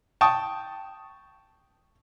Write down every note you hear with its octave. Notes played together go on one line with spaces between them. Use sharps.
G5 A5 C#6 D#6